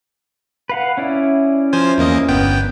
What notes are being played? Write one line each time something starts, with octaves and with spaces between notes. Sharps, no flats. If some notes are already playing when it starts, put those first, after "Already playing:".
B4 F5 F#5
C#4 E4 D5
F3 C5 G#5
E2 A#3 D#5
G1 B3 G5